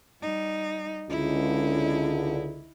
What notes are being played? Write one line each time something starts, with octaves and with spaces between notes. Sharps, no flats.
G3 D#4
C#2 D3 D#4 E4